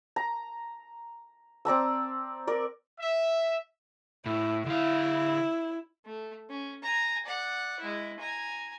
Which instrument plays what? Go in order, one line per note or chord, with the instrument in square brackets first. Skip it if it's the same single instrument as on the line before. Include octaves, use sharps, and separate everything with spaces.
[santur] A#5
C4 D5 A#5 E6
A#4 D5
[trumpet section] E5
[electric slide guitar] A2 [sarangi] E4
[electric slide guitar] D3 F5 [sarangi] E4
[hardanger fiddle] A3
C#4
G#5 A#5
D5 F#5
G#3 E4
G#5 A#5